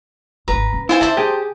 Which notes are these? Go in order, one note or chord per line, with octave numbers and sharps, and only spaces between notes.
G#1 G#2 B4 A#5
C#4
E4 F4 C5 G#5
D3 C5 D5 E5 A5
G4 G#4